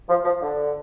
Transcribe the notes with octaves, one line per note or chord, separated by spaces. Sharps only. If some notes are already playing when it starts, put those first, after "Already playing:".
F3
F3
D3